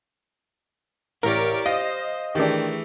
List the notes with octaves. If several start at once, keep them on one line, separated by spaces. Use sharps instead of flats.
A1 G4 A#4 C#5 D5
C5 D#5 F5 A#6
D#3 E3 A3 D4 G4 G#4